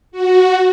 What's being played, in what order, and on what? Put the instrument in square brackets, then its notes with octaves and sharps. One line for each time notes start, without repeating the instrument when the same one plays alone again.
[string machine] F#4